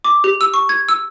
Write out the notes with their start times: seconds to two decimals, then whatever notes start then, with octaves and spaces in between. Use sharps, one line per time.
0.04 D6
0.24 G4
0.41 E6
0.54 C#6
0.69 G#6
0.89 E6